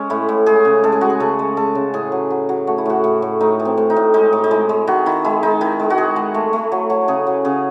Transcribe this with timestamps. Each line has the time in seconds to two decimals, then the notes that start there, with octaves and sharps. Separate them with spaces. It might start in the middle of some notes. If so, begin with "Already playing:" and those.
Already playing: G#3 C#4
0.10 A2 E4
0.29 A2
0.46 G#3 G#4
0.65 C#3
0.83 G#3 A4
0.92 G#4
1.01 G#3 F#4
1.10 G#4
1.20 C#3 A4
1.39 G#3
1.57 G#3 A4
1.75 C#3
1.94 A2 G#4
2.12 F#3
2.30 F#3
2.49 F#3
2.67 A3 F#4
2.78 E4
2.86 A2 F#4
3.04 A2
3.22 A2
3.41 A2 D#4
3.60 E3
3.65 C4
3.77 A2
3.90 D#4
3.96 A2
4.14 G#3 D#4
4.33 A2
4.44 D#4
4.51 G#3 E4
4.69 G#3
4.87 D#3 F#4
5.06 D#3 E4
5.24 G#3 E4
5.43 G#3 D#4
5.61 D#3 E4
5.79 G#3
5.90 F#4
5.98 G#3 G#4
6.16 G#3
6.34 A3
6.53 A3
6.72 F#3
6.90 F#3
7.08 C#3 G#4
7.27 F#3
7.45 C#3 G#4